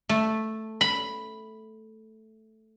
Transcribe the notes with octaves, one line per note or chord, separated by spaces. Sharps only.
A3
B5